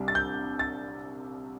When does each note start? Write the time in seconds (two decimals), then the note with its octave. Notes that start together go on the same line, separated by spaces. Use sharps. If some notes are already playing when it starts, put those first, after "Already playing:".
Already playing: C2 C3 G3 D4
0.08 A6
0.15 G6
0.59 A6